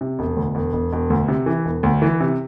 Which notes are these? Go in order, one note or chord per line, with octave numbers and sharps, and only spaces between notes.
C3
E1
D2
E1
E1
E1
D2
C3
E3
E1
D2
E3
C3